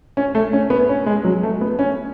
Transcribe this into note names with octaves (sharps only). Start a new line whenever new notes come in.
C#4
A3
C#4
B3
C#4
G#3
F#3
A3
B3
C#4